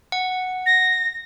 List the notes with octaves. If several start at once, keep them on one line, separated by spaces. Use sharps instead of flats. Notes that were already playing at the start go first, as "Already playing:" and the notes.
F#5
A#6